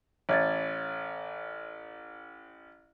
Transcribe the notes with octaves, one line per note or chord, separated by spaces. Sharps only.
A1 C#5 G#6 A6